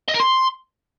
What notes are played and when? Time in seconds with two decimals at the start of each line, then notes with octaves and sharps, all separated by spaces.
0.09 D#5
0.14 A#4
0.20 C6